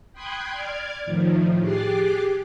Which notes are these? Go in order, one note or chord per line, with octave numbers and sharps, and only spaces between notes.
G5 B5 C6 D#6 F#6 G#6
D5 D6 F6 G#6
A2 D#3 F3
G4 G#4 D6 F#6 A6 C7